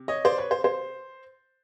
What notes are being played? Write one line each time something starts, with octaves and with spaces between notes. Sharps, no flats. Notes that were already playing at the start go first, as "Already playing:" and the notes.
Already playing: C3
C#5 D#5
C5 D5
B4 C#5
C5
C5